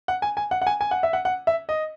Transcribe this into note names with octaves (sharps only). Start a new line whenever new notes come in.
F#5
G#5
G#5
F#5
F#5
G#5
G#5
F#5
E5
F#5
F#5
E5
D#5